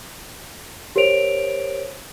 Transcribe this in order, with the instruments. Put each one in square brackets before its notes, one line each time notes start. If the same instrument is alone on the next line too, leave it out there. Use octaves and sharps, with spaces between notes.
[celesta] G4 A#4 C5 C#5 D7 F7